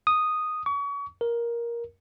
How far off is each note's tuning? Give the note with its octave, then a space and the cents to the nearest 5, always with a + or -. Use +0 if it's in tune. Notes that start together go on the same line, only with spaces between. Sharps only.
D#6 -5
C#6 +35
A#4 +10